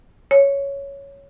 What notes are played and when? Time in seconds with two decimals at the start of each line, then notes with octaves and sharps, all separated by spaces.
0.31 C#5